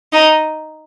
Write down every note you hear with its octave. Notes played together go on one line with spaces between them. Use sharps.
D#4